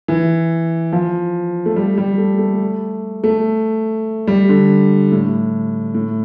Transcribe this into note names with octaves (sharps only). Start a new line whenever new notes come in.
E3
F3
A3
G3
G3
A3
A3
A3
G3
D3
A2
A2